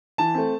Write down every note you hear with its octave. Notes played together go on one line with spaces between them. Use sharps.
E3 A5
A3 C4